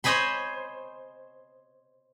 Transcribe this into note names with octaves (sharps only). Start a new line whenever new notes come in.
C5 C#5 D#5 G#5 B5 C6